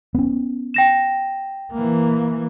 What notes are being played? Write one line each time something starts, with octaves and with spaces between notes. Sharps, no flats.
B3 C#4
G5 A#6 E7
E3 A#3